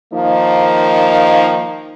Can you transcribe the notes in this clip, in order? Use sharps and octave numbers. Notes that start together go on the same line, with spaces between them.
D#3 F3 A#3 D#4